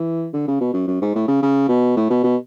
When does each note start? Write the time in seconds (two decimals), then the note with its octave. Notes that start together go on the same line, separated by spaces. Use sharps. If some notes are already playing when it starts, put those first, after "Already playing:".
Already playing: E3
0.33 D3
0.48 C#3
0.61 B2
0.74 F#2
0.88 F#2
1.02 G#2
1.15 A2
1.28 C#3
1.42 C#3
1.69 B2
1.97 A2
2.10 B2
2.24 B2